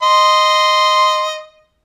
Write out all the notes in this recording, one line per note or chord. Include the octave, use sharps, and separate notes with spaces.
D#5 C6